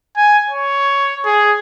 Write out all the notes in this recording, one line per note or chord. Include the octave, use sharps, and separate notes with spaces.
G#5
C#5
G#4